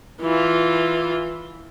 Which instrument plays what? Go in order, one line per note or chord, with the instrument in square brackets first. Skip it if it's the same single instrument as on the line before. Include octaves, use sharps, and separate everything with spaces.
[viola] E3 F4